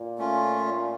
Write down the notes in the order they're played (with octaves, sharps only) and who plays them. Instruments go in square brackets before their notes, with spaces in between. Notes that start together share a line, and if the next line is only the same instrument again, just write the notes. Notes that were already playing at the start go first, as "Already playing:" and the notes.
Already playing: [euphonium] A#2
[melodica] A3 C#4 F4